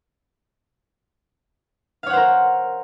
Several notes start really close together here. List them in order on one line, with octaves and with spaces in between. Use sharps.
F5 C#5 F#5 C5 A#4